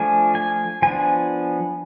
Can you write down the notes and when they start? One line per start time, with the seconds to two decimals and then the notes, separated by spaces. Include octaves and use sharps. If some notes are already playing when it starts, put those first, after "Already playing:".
Already playing: F3 A3 D4 G#5
0.35 G#5
0.82 F3 B3 D4 G#5